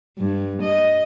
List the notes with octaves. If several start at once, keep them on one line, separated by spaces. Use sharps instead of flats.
G2
D#5